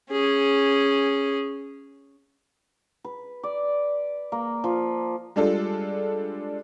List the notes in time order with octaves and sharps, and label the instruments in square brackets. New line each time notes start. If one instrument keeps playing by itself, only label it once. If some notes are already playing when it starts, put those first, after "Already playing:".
[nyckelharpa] C#4 G#4
[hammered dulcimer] B4
D5
A#3
F3
[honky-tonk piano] G3 G#3 D4 F4 A4